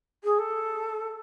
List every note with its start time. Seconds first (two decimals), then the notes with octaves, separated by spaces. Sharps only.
0.24 G#4
0.39 A4